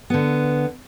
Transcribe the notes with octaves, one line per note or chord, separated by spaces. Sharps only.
D3 B3